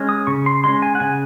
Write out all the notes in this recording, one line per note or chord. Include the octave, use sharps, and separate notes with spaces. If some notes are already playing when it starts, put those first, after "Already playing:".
Already playing: G#3 C#4
D#6
C#3 C#6
C6
G#3 C#4 C6
G#5
F#5
C#3 G#5